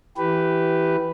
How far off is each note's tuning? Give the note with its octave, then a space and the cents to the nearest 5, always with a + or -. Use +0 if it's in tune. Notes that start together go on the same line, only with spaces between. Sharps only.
E3 +0 G4 -15 B4 +5